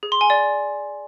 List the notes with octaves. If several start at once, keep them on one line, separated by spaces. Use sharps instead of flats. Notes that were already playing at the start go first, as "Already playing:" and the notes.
G#4
C6
G#5
D5